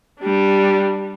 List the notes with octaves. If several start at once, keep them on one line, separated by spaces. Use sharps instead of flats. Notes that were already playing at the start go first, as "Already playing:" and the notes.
G3 D4